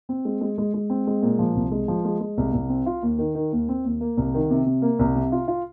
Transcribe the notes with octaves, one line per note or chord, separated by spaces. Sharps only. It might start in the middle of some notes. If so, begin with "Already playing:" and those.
C4
G#3
G#3
G#3
G#3
C4
G#3
A#2
F3
C2
G#3
F3
G#3
G#3
C2
C2
C4
F4
D#2
D#3
D#3
D#2
C4
D#2
A#3
C2
D#3
C3
C3
A#3
C2
C3
F4
F4